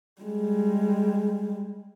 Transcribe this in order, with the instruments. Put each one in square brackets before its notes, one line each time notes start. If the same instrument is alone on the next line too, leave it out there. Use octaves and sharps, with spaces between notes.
[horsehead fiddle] G3 G#3